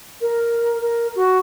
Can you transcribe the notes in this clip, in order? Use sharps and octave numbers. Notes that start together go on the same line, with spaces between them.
A#4
A#4
F#4